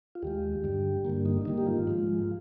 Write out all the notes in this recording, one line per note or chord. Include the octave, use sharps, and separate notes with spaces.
F4
D#2 D#3 G#3 G4
G2 D3 G3
G2 D3 G3 A#3
D#4
G#2 D#3 G3 A#3 D#4
G4
F4
G#2 F3 G#3